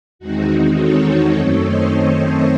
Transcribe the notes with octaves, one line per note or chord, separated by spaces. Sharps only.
E2 D#3 G#3 C4 D#4 F#4
A4 C#5
F#2 D#3 A3 C4
C5 D#5
A4 C#5
A4 C#5